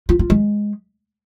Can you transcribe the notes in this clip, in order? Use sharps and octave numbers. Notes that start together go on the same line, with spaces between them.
F4
F4
G#3